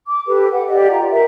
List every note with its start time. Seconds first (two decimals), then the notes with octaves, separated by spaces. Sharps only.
0.07 D6
0.27 G4 A4 B4
0.52 F#5
0.68 G4 D5 D#5
0.88 F4 A#5
1.09 A#4 E5 G5